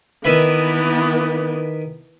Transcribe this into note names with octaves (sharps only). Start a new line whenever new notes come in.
D#3 E3 B3 B4 E5